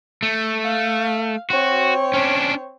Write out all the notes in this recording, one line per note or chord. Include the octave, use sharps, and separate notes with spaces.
A3
F5
C4 F#4 C#5
C#4 D4